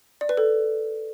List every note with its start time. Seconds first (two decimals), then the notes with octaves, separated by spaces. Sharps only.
0.21 D5
0.29 B4
0.37 A4